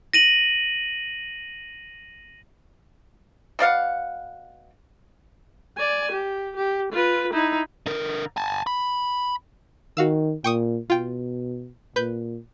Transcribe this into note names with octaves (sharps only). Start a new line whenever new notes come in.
A#6 D#7 F#7
B2 D5 F5 F#5
D5 G#5
G4
G4
F4 B4
D#4 E4
D3 A#4
G#5 A5
B5
D#3 F#4 F5 E6
A#2 G5 C#6 D#6
B2 F4 G5
A#2 B4 G6